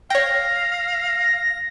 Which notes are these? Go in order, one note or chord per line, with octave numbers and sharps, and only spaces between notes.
C#5 F5 G5 A#6